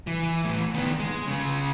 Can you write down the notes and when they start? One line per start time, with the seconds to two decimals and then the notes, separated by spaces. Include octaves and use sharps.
0.07 E3
0.45 A2 E3
0.74 D#3 B3
0.99 G#3
1.27 C#3 G#3